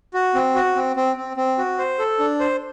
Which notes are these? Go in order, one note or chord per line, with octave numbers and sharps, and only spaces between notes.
F#4
C4
F#4
C4
C4
C4
C4
F#4
C5
A4
D4
C5